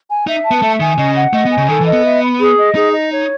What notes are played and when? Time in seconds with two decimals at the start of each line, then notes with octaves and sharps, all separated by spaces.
0.09 G#5
0.27 D#4 E5
0.45 A5
0.51 B3
0.62 A3 E5
0.80 D#3 G#5
0.98 C#3 D#5
1.16 F#5
1.33 A3 D#5
1.45 B3
1.52 G#5
1.58 C#3
1.69 D#3 A4
1.81 E3
1.87 D#5
1.93 B3
2.05 E5
2.22 B5
2.40 G#4
2.58 D#5
2.75 D#4 G#4
2.93 D#5
3.11 C#5